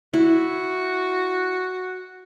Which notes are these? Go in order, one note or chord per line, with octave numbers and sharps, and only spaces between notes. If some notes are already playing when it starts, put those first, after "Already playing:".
E4 F#4